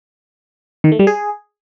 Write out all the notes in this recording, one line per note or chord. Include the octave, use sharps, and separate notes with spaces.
D#3
A3
G3
G#4